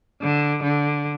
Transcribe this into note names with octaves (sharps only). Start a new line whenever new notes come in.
D3
D3